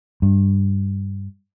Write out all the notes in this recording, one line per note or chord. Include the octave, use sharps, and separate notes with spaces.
G2